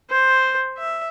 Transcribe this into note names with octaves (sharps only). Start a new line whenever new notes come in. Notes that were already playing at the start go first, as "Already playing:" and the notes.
C5
E5